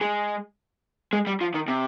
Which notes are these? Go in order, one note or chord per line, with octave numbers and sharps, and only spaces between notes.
G#3
G#3
G3
F3
D#3
C3